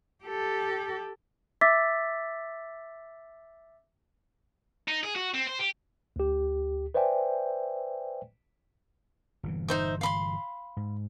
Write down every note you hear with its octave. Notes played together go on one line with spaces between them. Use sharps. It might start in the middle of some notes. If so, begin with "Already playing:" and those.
G4 A4
E5 D6 E6 A6 B6
D#4
G#4
F#4
C4
C5
G4
D2 G4
B4 C5 D5 E5 G5 G#5
G1 A#2 E3
D#4 C5 E5
F5 B5 C6
G#2